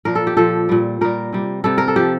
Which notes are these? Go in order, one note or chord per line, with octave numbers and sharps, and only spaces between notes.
A#2 F3 A#4
A4
G4
A#2 F3 A4
A#2 G3
A#2 G3 A#4
C3 G3
C3 G3 A4
A#4
A4
F3 G4